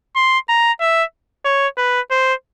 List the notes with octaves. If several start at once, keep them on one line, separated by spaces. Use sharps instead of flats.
C6
A#5
E5
C#5
B4
C5